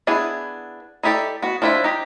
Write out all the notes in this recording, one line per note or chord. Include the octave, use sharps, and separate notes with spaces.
B3 D4 E4 G#4
D#4 E4 G4 A4 D5
B3 F#4
F3 D4 E4 A4 E5
D#4 G4